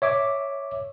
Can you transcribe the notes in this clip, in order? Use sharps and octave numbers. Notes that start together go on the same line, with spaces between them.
C#5 E5 D6